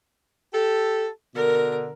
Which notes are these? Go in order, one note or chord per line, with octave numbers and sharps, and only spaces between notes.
G4 A4
B2 D3 A#4